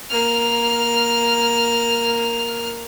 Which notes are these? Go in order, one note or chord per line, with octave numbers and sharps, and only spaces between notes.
A#3 F6